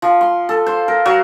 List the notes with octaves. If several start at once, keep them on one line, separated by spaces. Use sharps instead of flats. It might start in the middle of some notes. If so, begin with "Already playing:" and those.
F3
C6
A4
C5
A#4
F#3